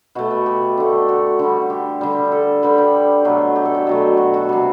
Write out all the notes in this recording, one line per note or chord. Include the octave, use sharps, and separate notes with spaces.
B2 A3 F#4
B4
G4
D3 A3
F#4
D3 G3
G4
D3 G3
A4
D3 G3 B4
G4
B2 F#3 A3
G4
A4
G4
B2 F#3 A3
F#4
F#4
C3 G3